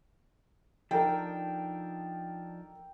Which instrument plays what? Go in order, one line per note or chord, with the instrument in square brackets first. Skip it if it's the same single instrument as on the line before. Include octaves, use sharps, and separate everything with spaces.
[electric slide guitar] F3 D4 D#4 [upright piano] A4 A#4 [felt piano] G5